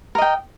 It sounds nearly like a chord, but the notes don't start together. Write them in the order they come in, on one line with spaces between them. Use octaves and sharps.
A#4 D#5 G5